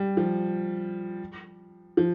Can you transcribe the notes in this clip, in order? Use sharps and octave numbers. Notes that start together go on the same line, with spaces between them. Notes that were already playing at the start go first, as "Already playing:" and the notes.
Already playing: G3
F3
F3